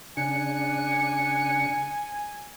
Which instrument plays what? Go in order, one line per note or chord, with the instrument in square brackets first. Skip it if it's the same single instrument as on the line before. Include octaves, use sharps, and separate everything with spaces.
[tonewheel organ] C#3 D4 [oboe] G#5 [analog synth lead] C#7